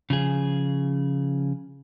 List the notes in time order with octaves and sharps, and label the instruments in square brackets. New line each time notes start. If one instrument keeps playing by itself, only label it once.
[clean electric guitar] C#3 F3 G#4